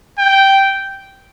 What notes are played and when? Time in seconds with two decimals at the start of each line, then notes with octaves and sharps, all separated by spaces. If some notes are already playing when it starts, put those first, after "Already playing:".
0.18 G5